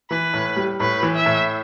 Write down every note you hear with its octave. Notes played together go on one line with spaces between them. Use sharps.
E3 B4
A2
G3
A2 B4
E3
E5
A2